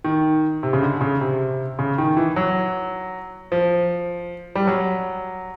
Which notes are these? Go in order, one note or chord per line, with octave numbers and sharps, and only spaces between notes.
D#3
C3
C#3
D3
C#3
C3
C#3
D#3
E3
F#3
F3
G3
F#3